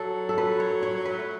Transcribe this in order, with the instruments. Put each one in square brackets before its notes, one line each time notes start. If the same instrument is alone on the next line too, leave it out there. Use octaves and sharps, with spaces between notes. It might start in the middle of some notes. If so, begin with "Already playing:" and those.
Already playing: [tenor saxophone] F#3 [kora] A4
[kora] A4
B4
C#5
C#5
B4
[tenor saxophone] A3